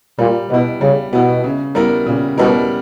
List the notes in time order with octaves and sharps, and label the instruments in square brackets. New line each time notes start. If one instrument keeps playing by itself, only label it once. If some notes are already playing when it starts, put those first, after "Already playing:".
[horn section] A#2 [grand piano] G3
[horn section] B2 [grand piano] B3 E4
[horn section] C#3 [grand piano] G3
[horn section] B2 [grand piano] B3 E4
[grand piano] C#3
G3 B3 E4 A#4
[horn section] A#2 [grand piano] C#3
[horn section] B2 [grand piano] G3 B3 E4 A#4